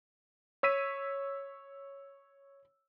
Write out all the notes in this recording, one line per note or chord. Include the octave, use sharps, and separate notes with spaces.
C#5 E6 B6 D#7